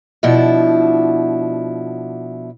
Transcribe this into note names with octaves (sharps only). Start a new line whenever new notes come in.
B2 F3 D4 E4